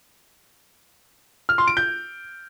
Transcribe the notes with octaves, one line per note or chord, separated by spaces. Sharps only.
F6
C6
D7
G6